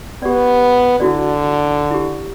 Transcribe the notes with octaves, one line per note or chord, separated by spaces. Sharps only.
B3 G4 D5
D3 E4 F#4 D5
E4 G4